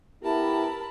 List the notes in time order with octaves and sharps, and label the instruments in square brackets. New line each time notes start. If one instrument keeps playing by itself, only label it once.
[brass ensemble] B3 E4 G4 [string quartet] A#4 A5 B5